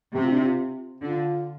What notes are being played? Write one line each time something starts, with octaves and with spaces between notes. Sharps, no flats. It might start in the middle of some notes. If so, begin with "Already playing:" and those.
C3 G4
F4
D4
F4
D3 F4